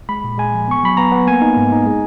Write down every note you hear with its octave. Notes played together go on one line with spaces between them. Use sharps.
G#3 B5
A#2
G#3 G#5
F3
B3 C#6
F#3 B5
B3 A#5
B3
A#3 G#5
D#4
G#2
D#4
G#3